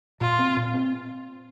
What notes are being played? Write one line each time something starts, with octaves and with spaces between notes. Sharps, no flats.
A#2 F4
C4
A#2
C4